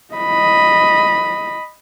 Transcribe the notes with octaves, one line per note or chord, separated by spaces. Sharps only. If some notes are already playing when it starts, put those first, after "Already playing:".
D#5 B5